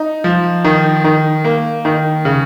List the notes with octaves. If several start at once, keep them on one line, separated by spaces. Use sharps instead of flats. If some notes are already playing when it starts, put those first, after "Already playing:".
Already playing: D#4
F3
D#3
D#3
A#3
D#3
C#3